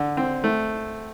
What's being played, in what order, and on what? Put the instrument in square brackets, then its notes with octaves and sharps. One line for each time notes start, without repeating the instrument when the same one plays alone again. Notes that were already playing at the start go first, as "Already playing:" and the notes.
Already playing: [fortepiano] D3
C4
A3